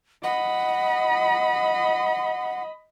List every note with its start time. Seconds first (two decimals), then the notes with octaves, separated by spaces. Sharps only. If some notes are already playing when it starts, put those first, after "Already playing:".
0.24 D#5 F#5 B5